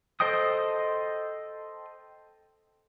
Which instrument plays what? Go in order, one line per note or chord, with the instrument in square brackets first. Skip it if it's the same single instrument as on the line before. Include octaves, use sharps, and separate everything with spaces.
[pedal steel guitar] A4 C5 D#5 G5 D#6